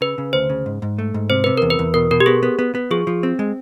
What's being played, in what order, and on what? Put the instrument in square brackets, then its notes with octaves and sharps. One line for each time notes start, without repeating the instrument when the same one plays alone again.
[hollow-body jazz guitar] C#3 [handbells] B4
[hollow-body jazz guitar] C#3
[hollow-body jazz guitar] D2 [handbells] C5
[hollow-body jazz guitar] C#3
G#2
G#2
A3
G#2
[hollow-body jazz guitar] C3 [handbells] C5
[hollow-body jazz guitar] C3 [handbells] B4
[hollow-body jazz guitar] E2 [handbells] A#4
[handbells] B4
[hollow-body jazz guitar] E2
[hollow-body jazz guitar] B2 [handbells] A#4
[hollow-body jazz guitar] B2 [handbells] A#4
[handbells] G4
[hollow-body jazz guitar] B3 [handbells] G#4
[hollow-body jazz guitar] B3
B3
B3
[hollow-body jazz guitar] F3 [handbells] G#4
[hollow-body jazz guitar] F3
C4
G#3